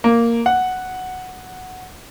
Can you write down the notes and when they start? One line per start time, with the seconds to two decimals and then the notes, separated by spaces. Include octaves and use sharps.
0.04 A#3
0.46 F#5